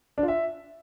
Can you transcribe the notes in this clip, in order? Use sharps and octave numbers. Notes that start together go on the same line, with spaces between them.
D4
F4
E5